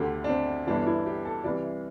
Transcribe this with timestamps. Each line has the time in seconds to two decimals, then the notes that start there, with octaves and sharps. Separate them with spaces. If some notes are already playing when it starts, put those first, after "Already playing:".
Already playing: D2 D3 G4
0.24 D4
0.29 C4
0.67 G1 G2 E3 D4
0.86 E4
1.06 G4
1.25 A4
1.44 C2 C3 E3 D5